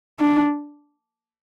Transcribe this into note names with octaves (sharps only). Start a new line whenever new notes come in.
D4